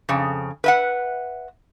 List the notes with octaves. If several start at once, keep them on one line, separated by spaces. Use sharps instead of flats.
F2 C#3
B4 E5 F#5